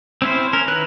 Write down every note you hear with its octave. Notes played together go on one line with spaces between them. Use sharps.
C4 C#4 E4 C5
C#4 A#4
D#3 E4 B4 F#6